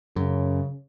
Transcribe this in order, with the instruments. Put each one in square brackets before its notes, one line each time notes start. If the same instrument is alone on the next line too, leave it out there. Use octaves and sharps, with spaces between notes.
[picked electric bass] F#2 [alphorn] C#3